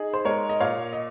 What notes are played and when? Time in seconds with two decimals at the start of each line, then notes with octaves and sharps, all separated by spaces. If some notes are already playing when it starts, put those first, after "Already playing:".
Already playing: D#4 G#4
0.14 C5
0.25 G#3 A#4 C#5
0.49 D#5
0.60 A#2 C#5 F5
0.93 D#5